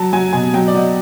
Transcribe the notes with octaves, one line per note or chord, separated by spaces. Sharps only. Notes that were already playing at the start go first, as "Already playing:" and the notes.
Already playing: F#3 A5
F#3 G#5
B2 G#5
F#3 G5
D5
F#3 D#5